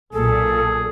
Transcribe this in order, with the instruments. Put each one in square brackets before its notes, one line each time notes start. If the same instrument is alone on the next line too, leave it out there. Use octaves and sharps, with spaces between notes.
[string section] B1 A#2 [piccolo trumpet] G#4 [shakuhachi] A4